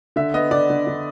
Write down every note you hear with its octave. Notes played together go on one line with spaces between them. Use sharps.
D3 E5
B3 D#5
D3 D5
D3
D3